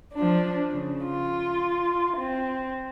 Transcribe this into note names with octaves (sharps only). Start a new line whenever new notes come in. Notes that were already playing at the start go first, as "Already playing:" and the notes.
F3 D4
C#3
F4
C4